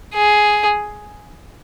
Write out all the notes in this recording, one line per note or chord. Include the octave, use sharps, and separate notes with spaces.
G#4